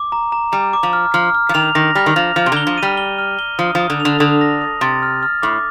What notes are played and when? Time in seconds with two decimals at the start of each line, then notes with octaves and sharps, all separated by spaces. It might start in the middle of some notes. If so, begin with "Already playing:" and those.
Already playing: D6
0.12 A#5
0.32 A#5
0.52 G3 A#5
0.73 D6
0.83 F3
0.93 F6
1.14 F3 F6
1.35 F6
1.49 F3
1.54 D#3 F7
1.75 D#3 A#6
1.95 G3 F6
2.06 D#3
2.16 F3 F7
2.36 F3 F6
2.46 C3
2.52 D3 G7
2.67 F3
2.78 G3 D#7
2.97 G7
3.18 F6
3.39 G7
3.58 F3 D#6
3.75 F3 D#6
3.90 D3
4.00 F7
4.05 D3
4.20 D3 D#6
4.41 A#6
4.62 D#6
4.81 C3 A6
5.03 F6
5.23 F6
5.42 A2 D6